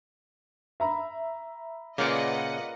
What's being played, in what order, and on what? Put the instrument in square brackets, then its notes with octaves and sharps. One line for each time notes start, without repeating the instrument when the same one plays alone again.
[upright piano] E5 A#5 B5
[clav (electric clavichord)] A#2 C#3 [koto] A#3 F4 D5 [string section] B4 D#5 F#5